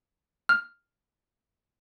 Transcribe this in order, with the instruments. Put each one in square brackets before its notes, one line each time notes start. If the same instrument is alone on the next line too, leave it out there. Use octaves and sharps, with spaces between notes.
[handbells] F6